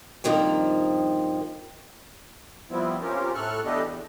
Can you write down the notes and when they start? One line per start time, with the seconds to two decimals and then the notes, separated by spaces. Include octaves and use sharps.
0.24 G2 A#2 D#3 F3 A#3 C4
2.71 F3 G3 B3 C4 E4
3.01 C4 C#4 F4 G4 A#4
3.34 A2 A4 C#6 F6 F#6
3.65 E3 B3 D4 G4 A4 D#5
3.84 E2